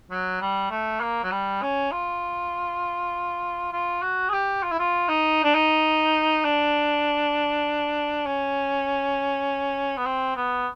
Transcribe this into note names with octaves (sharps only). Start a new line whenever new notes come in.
F#3
G3
A3
A#3
F#3
G3
C#4
F4
F4
F#4
G#4
G4
F4
E4
F4
D#4
D4
D#4
D4
C#4
B3
C4
B3